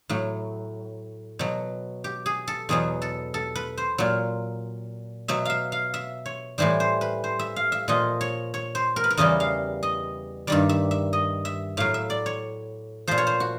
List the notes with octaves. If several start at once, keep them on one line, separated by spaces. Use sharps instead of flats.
A2 F#3
B2 F#3
G4
G#4
A4
E2 B2 F#3 G#4
A4
A4
B4
C5
A#2 F#3
B2 F#3 E5
E5 F5
F5
E5
C#5
A2 E3 G3 C5
C5
B4
C5
E5
F5
E5
A#2 F3 D#5
C#5
C#5
C5
A#4
B4
A#4
E2 C#3 E3 G3 D#5
F5
D#5
G2 D#3 G3 D5
E5
E5
D#5
E5
A2 F#3 F5
E5
D5
C#5
A#2 F3 C5
C#5
C5
F#4